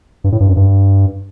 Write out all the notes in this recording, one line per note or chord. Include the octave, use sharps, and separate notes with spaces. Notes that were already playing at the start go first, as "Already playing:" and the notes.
G2
A2
G2
F#2
G2